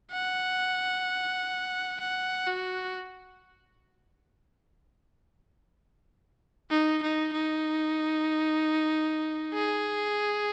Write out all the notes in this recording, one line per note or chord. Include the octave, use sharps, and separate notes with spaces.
F#5
F#5
F#4
D#4
D#4
D#4
G#4